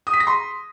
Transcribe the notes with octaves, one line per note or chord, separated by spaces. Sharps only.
D#6
B6
A#6
C6